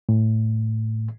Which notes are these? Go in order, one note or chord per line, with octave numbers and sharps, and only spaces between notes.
A2